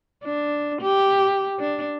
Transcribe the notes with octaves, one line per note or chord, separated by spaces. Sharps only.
D4
G4
D4